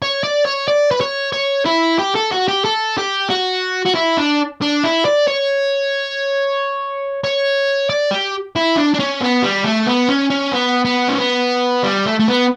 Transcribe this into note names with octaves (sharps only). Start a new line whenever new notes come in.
C#5
D5
C#5
D5
B4
C#5
C#5
E4
G4
A4
F#4
G4
A4
G4
F#4
F#4
E4
D4
D4
E4
D5
C#5
C#5
D5
G4
E4
D4
D4
C#4
B3
G3
A3
B3
C#4
C#4
B3
B3
C#4
B3
G3
A3
A3
B3